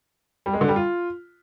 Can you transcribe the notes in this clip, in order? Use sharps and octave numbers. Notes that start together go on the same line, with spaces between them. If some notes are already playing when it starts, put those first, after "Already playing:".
G3
G#3
D3
G3
F4